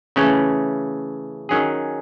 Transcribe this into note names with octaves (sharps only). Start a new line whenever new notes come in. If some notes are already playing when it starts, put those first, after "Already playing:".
C#3 E3 A3 C#4
D#3 F#3 C#4 G#4